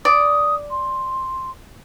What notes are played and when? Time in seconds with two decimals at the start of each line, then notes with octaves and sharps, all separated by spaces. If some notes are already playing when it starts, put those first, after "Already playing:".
0.05 D5 D#6
0.70 C6